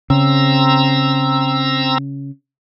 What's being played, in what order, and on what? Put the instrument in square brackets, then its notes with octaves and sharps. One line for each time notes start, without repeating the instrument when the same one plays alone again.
[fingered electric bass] C#3 [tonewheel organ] C4 A#5 E6